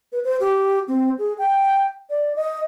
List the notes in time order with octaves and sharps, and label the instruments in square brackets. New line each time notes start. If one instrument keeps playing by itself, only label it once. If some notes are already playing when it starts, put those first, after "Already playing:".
[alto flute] B4
C5
G4
C4
G#4
G5
D5
D#5